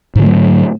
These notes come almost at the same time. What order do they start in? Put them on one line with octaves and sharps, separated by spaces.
G#2 D3 A3 F#3